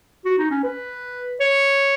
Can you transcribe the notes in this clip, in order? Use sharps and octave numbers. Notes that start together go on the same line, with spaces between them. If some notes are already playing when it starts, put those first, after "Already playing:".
F#4
D#4
C#4
B4
C#5